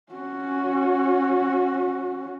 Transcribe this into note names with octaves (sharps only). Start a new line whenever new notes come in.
C#4 F#4